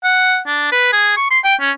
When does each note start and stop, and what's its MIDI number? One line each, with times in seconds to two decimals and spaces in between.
0.04 0.39 78
0.47 0.68 62
0.72 0.88 71
0.93 1.14 68
1.17 1.28 85
1.30 1.39 84
1.44 1.55 79
1.60 1.71 61